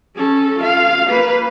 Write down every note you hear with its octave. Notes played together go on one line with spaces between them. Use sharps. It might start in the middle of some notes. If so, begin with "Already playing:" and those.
C#4 A4
F4 F5
A#3 B4